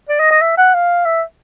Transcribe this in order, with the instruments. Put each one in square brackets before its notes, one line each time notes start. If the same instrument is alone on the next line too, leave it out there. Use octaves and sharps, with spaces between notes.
[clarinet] D5
D#5
D#5
E5
F#5
F5
E5